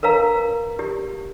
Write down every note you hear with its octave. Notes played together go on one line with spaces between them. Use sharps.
A#4 B4 F5 A#5
G4